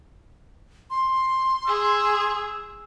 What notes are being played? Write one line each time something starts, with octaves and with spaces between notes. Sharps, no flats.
C6
G#4 E6